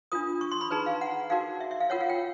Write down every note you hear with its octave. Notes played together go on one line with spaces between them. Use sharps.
D4 F4 A#4 D#6
C#6
C6
B5
D#4 G#4 B4 A#5
F5
F#5
D#4 F#4 A#4 F5
E5
E5
F5
F4 A#4 C#5 F#5
F5
G5